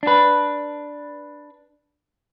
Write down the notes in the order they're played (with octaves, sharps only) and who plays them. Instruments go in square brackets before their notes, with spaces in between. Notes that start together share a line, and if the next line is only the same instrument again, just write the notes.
[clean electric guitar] D4 B4